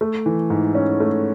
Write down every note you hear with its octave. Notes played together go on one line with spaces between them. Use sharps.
A3
E3
G#2
C#4
A3